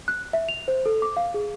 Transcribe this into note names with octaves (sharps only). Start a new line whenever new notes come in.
F#6
E5
F7
C5
A4
D6
F5
G#4